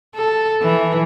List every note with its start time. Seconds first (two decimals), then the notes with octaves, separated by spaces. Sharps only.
0.16 A4
0.62 E3